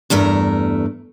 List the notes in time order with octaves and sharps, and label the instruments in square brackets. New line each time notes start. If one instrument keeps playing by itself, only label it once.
[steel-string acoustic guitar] E2 G2 A3 A#4